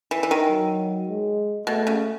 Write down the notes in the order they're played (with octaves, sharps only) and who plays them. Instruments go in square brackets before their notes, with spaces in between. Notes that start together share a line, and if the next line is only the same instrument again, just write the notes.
[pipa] E3
E3
D#3
[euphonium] F#3
G#3
[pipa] B2 [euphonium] A3
[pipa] C#3